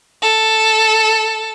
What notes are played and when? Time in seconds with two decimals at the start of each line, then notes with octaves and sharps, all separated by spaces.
0.22 A4